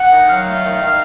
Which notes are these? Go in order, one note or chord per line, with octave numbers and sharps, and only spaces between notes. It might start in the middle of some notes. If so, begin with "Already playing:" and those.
Already playing: F#5
D#3
F#3 F5
A3
D#3
D#3